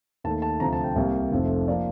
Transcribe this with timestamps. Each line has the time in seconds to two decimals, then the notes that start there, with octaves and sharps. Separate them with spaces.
0.24 D#2 D#3 A3 A5
0.42 A5
0.60 D2 C3 F3 A#5
0.73 A5
0.84 G5
0.96 C2 C3 G3 A#3
1.31 F1 F2 C3 F3 A3
1.68 F3 A#3 D5